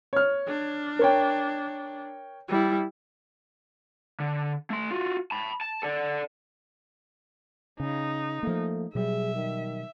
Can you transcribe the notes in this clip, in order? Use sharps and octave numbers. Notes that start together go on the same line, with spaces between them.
C#5 F6
D4
A#4 C#5 G5
G3 E4
D3
A3 C6
F4 F#4
A5 B5
A5
A4 D5
C#3 D#4
F3 A3 A#3
B2 F#3 G3 G#4 E5
D#3